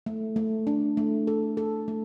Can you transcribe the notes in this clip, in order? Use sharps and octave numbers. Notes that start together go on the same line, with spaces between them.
A3
A3
D4
A3
A4
A4
A3